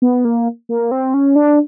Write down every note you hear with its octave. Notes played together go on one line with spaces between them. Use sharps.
B3
A#3
A#3
C4
C#4
D4